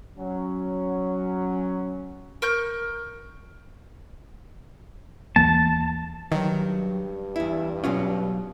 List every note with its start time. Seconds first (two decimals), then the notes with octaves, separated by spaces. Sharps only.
0.18 F#3 C#4
2.42 A#4 C#6 G6
5.36 D#2 E3 A#3 A5
6.32 G2 D#3 F#3
7.36 E2 E4
7.84 B2 F#3 C#4 F4